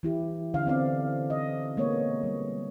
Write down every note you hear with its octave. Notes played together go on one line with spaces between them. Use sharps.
E3 E4 G4
D3 C#4 F5
B3 C4 D5 F5
D#5
G#3 A#3 B3 C#5
G3